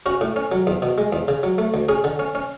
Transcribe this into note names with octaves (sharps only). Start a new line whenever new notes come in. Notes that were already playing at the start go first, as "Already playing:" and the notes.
C#4 F#4
A2
C#4
F#3
E2
B2
G#3
E2
C#3
F#3
A3
D2
C#4 G#4
D3
C#4
C#4